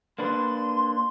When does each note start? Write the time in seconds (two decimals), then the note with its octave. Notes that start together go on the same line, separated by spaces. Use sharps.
0.19 A#3 D4 B4 C6